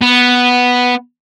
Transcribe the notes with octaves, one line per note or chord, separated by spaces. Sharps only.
B3